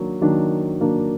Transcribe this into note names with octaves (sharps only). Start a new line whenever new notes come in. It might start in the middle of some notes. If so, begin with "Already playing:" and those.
Already playing: D#3 F#3 A#3 D4
D#3 F#3 A#3 D4
D#3 F#3 A#3 D4